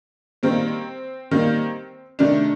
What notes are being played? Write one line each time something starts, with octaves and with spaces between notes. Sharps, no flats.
D#3 G3 A#3 C4
D#3 G3 A#3
C3 D#3 A3 D4